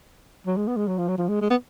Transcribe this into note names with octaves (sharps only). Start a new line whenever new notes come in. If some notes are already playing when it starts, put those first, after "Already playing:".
F#3
G#3
B3
G#3
F#3
F3
F#3
F3
G#3
G#3
B3